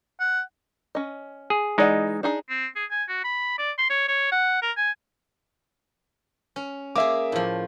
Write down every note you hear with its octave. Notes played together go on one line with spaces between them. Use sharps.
F#5
C#4 D#5
G#4
E3 G#3 D#4 D5 F#5
D4 D#4 G#4
C4
G#4
G#5
F#4
B5
D5
C6
C#5
C#5
F#5
A#4
G#5
C#4
A#3 G#4 E5 D6
A2 F3